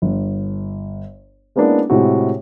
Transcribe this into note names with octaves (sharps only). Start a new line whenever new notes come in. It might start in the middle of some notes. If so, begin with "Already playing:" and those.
G1
G#3 A#3 B3 C#4 D4 E4
A2 C3 G#3 E4 F#4 G4